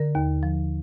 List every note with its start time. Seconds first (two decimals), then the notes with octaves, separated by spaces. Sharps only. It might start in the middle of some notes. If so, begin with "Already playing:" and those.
Already playing: D3 A#4
0.15 D#2
0.43 F3